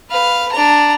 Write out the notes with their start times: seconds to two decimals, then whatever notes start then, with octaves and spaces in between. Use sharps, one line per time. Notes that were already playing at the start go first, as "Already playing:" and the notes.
0.10 B4 F5
0.52 D4 A#5